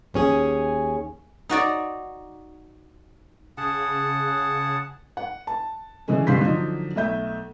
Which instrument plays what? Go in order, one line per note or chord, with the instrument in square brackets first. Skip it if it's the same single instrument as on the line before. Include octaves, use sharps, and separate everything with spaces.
[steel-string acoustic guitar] D#2 C#4 G#4
[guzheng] D#4 F#4 D5
[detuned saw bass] C#3 [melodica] G#4 F#5 A5
[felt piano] F#5
A5
D3 E3 G#3 C#4
G2 D3 F5 C6 G6 B6
D3 F3 F#3 D#4
B1 A3 E5 G6